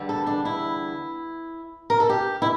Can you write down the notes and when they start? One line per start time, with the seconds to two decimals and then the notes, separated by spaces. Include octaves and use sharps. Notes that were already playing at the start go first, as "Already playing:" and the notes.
Already playing: E2 D3 G3
0.09 A4
0.27 D4
0.45 E4
1.90 A#4
2.00 A4
2.09 G4
2.42 E4